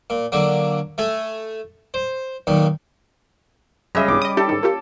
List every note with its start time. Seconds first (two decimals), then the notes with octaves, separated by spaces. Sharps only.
0.10 A#2
0.32 D3 F#3 A#3
0.98 A3 A4 G#5
1.94 C5
2.47 B1 A#2 D#3
3.95 F#2 C#3 G3 D#5 E5
4.08 B1 E2 G2 D6
4.22 D#5 D#6
4.37 D4 E4 G4 A4
4.49 G#2 D#3
4.63 A#3 F4 G4